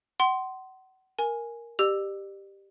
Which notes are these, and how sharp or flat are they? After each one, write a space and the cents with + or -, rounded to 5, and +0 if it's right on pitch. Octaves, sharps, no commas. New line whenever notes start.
F#5 +35 C6 +0
A#4 +5 G#5 +0
G4 +0 D5 +40 E6 +5